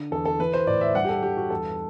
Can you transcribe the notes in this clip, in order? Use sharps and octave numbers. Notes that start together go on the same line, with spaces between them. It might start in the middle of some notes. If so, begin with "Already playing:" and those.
Already playing: D3
E2 A4
A4
E3 B4
C5
A2 D5
E5
G2 F#5
G4
A4
G2 G4
F#4
E2 A4